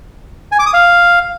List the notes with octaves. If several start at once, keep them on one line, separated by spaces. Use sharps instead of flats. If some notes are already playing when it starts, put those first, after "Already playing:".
G#5
D6
D#6
F5